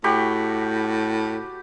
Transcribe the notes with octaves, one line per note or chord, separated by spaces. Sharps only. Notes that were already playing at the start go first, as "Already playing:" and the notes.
A2 F#4 G4 B5